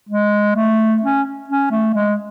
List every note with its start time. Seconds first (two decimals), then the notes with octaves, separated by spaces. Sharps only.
0.09 G#3
0.55 A3
1.02 C#4
1.48 C#4
1.70 A3
1.94 G#3